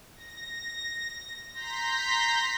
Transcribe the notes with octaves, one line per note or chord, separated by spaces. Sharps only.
A#6
A#5 C6 G6 A#6 B6